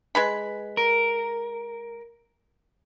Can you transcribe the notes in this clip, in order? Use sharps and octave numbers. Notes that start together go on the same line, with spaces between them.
G#3 B4 B5
A#4